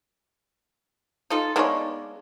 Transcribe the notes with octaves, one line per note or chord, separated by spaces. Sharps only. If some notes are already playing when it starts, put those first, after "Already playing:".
D#4 F4 A4
G#3 A#3 B3 D4 D#4 C#5